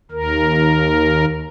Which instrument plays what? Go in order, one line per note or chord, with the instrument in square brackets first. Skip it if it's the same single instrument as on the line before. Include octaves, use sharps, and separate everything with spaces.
[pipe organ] D#2 A#4